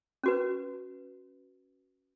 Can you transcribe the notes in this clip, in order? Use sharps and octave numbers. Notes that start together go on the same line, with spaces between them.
C#4 F#4 B4